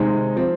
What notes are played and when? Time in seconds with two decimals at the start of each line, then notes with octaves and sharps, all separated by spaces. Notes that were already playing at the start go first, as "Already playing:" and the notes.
Already playing: C3 D#3 G#3 C4 D#4
0.36 F3 C4